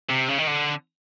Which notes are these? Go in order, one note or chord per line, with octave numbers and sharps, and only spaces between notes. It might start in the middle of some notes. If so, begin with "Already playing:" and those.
C3
C#3
D#3
D3